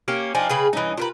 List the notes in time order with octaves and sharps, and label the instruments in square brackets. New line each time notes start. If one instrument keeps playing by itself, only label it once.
[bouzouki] A#3 C#4 G4
[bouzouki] F3 D4 D#4 [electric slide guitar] G5 G#5
[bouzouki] C#3 G#4 B4
[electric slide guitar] G2 C#4 D#5 [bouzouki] E3 D#4
[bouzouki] D4 G4 B4 [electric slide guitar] F4 A#4 A#5